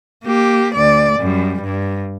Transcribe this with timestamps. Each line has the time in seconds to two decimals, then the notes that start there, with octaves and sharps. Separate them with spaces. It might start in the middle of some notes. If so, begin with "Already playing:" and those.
0.24 A#3 G4
0.74 D2 D5
1.19 F#2 G3
1.62 G2